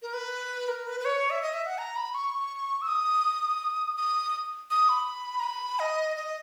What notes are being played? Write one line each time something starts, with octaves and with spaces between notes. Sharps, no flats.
A#4
B4
A#4
B4
B4
C#5
E5
D#5
E5
F#5
A#5
B5
C#6
E6
D#6
D#6
D#6
B5
A#5
B5
D#5
D#5